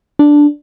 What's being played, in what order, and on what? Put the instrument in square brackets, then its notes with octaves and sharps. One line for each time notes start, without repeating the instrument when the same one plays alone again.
[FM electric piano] D4